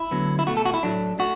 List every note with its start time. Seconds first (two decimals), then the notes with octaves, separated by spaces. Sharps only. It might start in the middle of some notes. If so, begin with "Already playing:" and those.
Already playing: E4
0.11 D2 D3 F#3 B3
0.39 E4
0.47 B2 A3 F#4
0.57 A4
0.66 F#4
0.74 E4
0.83 A2 F#3 A3 D4
1.19 A3 F#4